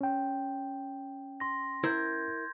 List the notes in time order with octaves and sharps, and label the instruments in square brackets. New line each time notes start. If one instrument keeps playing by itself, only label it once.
[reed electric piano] C#4 G5
[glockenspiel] C6 A#6
[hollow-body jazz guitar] E4 A#4 C5 [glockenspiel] G6 G#6